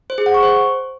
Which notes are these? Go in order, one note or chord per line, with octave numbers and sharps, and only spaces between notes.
C5
G#4
F#5
C#6
C5